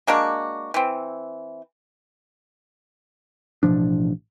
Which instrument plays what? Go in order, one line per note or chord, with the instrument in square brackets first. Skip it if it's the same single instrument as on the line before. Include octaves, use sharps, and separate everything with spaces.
[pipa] G#3 A#3 D4 F#4
E3 C4
[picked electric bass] A1 B2 F3 D4